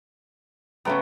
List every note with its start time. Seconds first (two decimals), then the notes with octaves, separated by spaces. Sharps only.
0.85 C#3 A3 B3 C#5 G5 A#5